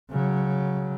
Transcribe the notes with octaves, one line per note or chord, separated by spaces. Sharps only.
C#3 F#3